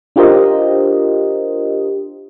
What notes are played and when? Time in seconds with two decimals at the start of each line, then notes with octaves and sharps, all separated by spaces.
0.16 D4 F4 G4 A#4 C5 D#5